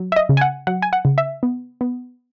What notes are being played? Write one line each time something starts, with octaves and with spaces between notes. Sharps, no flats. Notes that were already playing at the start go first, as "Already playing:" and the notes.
Already playing: F#3
E5
D#5
C#3
G#5
F#5
F#3 F#5
G#5
F#5
C#3
E5
B3
B3